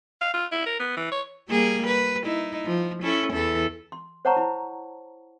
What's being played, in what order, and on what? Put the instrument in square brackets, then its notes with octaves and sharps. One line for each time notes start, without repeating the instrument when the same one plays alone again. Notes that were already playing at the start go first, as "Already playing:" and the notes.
[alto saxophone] F5
F4
E4
A#4
B3
E3
C#5
[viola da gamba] G3 A#3 G#4
B4
D#4 E4
F3
C#4 E4 A4
E2 E3 A4
[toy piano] C6
C5 C#5 F#5 A5 A#5 C#6
E4 B5